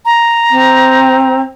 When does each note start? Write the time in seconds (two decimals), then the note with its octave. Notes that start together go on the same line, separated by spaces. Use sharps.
0.05 A#5
0.50 C4